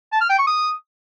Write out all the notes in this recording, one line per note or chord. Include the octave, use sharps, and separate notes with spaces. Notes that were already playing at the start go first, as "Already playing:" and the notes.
A5
F6
G5
C#6
D#6